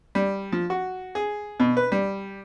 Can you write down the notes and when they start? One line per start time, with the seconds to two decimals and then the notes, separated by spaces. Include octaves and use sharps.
0.15 G3
0.52 F3
0.70 F#4
1.15 G#4
1.60 B2
1.77 B4
1.92 G3